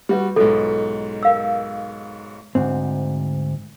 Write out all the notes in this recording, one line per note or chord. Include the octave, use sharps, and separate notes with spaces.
G3 F#4 G4 B4
B1 G#2 F4 A4
A#4 F5 E6
D2 G#2 C4